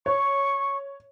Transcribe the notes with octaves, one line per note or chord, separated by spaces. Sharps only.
C#5 C#6